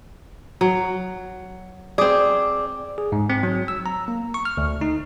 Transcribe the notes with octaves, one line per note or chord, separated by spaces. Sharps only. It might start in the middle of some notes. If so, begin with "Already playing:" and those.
F#3
C4 G#4 D5 D6
G#4
G#2
C4
F#3
E6
A#5
A#3
C#6
F6
D2
D#4